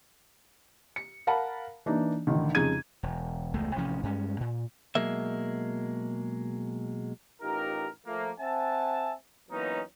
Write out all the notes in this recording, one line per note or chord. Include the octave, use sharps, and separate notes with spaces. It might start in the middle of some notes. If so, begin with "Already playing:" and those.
C#7
A#4 F5 F#5 A5 B5
E3 A#3 D4 D#4
A1 D3 D#3
F2 C#3 G#3 D#4 G#6 D#7
E1
E1 C#2 G#3 A3
A1 C3 F3 C#4
G2 G#3 C#4
A#2
B2 F3 F#3 G#3 A#3 E5
A1 D#4 F4 G4 A#4
F3 A3 A#3
C4 E5 F#5 G#5 A5
E3 F#3 A#3 B3 C#4 D#4